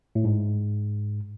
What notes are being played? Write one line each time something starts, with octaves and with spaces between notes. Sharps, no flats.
A2
G#2